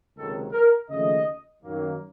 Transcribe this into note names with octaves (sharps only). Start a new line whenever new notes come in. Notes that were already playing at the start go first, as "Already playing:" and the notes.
C#2 C3 D#3 F#3 A4
A#4
D#2 C#3 F3 A3 D#5
F#2 D#3 F#3 A#3